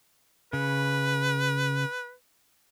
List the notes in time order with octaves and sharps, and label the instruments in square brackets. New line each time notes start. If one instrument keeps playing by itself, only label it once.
[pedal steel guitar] C#3 [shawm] B4